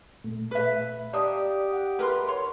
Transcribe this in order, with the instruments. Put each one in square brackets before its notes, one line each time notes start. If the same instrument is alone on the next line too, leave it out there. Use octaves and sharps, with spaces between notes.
[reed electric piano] A#2 A3
[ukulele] B4 E5
[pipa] A#3 D4 [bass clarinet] G4 [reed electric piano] D5 D#5 D#6
[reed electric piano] F#5
[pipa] E3 C6 [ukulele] A#4 B4
[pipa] C#5 C6